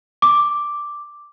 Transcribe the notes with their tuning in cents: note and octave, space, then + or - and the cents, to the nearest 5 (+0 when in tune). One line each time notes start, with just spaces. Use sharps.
D6 +0